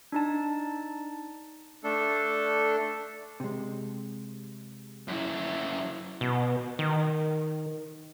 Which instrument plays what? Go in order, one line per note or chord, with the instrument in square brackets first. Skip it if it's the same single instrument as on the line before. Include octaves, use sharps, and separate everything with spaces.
[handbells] D4 D#4 A5
[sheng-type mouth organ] A3 D4 A4
[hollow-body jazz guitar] C3 G#3
[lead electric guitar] F#2 E4
[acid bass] B2
D#3